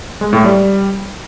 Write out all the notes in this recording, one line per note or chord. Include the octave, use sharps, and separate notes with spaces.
G#3
A2
G3